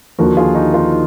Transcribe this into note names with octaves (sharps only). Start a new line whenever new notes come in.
D#2 D3 F3 F#4 A#4
F4 G#4
D#4 F#4
F4
D#4